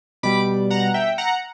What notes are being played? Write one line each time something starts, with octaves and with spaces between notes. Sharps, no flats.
B2 G3 B5 D6
F#5 A#5
E5 G5
F#5 A#5